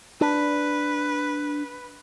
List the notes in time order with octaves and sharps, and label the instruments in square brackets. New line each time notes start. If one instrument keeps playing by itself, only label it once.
[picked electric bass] D4 [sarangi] B4